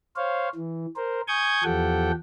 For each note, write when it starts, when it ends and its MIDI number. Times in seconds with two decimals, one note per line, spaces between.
0.16 0.49 72
0.16 0.49 73
0.16 0.49 77
0.55 0.86 52
0.96 1.21 70
0.96 1.21 72
1.28 1.63 80
1.28 1.63 85
1.28 1.63 87
1.28 1.63 91
1.28 1.63 92
1.64 2.12 40
1.64 2.12 53
1.64 2.12 67
1.64 2.12 69
1.64 2.12 78
1.64 2.12 79